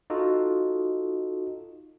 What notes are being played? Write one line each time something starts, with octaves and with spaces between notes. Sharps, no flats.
D#4 F4 F#4 A4 D#5